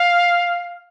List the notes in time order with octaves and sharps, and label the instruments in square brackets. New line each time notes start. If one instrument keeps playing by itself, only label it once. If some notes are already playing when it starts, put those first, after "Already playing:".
Already playing: [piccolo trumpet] F5